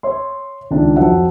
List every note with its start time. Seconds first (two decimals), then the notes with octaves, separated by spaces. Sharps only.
0.03 C#5 E5 C6
0.71 C#2 D#3 D4 E5
0.96 F2 F#3 E5 F#5 A5